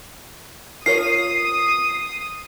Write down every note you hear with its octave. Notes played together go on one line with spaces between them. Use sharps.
F4 A#4 C#5 D#6 C7